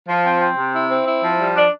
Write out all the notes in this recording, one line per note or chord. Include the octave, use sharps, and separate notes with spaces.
F3
C4
C4
C3
E4
C4
E4
F3
G3
D4